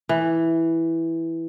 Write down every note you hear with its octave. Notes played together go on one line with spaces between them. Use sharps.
E3